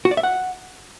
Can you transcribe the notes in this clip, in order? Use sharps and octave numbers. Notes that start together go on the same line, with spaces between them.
F#4
D5
E5
F#5